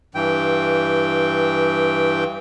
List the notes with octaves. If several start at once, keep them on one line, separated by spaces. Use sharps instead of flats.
G2 E3 G5